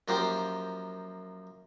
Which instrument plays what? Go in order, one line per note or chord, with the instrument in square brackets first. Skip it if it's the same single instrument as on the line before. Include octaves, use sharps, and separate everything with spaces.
[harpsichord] F#2 F3 A#3 G4 C5 G5